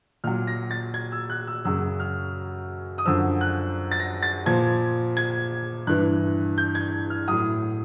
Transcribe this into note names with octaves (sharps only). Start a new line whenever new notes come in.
A#2 F#3 F6
A#6
A6
G#6
E6
F#6
E6
F#2 C#3 F#3 E6
F6
D#6
F#2 D3 F3 E6
F#6
A6
A#6
A6
A#2 F3 G#6
G#6
G2 E3 F#6
G6
G#6
F6
A2 F#3 D#6